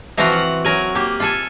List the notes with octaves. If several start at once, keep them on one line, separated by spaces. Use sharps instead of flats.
E3 F3 C4 F4 F#4 A#5
F#5
F#3 A#4 G#5
A#3 G4
F4 A4 G#5